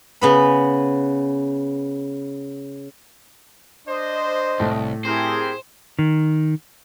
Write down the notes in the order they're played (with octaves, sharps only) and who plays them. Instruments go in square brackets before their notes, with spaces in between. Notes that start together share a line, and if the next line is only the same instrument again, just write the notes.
[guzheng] C#3 B3 B4
[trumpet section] D4 C5 [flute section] D#5
[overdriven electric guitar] C2 [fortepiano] A2
[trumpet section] C4 G4 A#4 [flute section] E4 G#4 [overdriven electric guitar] C5
[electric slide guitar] D#3